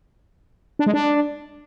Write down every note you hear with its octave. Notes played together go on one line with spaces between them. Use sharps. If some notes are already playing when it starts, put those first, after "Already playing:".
D4
G#3
D4